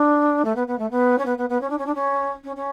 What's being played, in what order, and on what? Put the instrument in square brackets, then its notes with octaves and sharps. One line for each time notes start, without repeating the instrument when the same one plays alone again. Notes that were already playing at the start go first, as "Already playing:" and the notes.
Already playing: [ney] D4
A3
B3
B3
A3
B3
C#4
B3
B3
B3
C#4
D4
C#4
D4
C#4
C#4
C#4